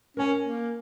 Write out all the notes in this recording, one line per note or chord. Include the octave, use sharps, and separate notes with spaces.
C#4 A#4 G#5
A#3